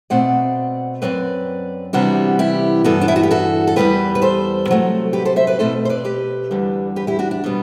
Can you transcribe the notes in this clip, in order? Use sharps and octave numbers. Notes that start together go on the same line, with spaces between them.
B2 A3 C4 D5 F#5
F#2 F#3 C4 B4 D5
C3 E3 G3 B3 D4 F#4
E4 G4
G2 E3 B3 F#4 A4
D4
E4
F#4
G4
F#4 A4
A4
E2 C3 G3 B3 G4 B4
B4
A4 C5
C3 F#3 A3
G4 B4
A4 C5
C5 E5
B4 D5
B2 A3 C4 A4 C5
C5
B4 D5
G4 B4
E2 D3 G3
G4 B4
E4 G4
D4 F#4
D4
B2 G3 B3